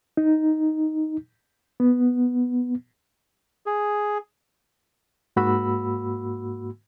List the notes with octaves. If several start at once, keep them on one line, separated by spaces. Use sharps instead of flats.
D#4
B3
G#4
G#2 A#3 F#4 B5 E6